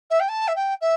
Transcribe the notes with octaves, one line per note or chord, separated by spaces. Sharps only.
E5
G5
A5
E5
G5
E5